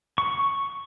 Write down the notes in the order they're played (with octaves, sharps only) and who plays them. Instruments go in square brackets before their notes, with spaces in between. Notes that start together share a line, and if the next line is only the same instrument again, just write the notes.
[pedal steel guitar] C#6